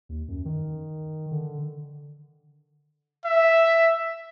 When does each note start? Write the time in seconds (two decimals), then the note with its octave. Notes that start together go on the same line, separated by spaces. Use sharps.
0.09 D#2
0.28 F#2
0.45 D#3
1.31 D3
3.25 E5